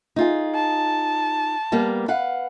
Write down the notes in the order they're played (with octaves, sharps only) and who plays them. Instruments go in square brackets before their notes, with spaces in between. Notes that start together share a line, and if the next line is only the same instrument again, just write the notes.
[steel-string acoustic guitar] D#4 F4 G#4
[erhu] A5
[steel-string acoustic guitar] G3 A#3 B3
B4 F5 F#5